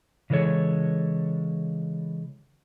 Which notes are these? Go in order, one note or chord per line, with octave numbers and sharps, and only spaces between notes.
C#3 E3 G#3 A4 C#5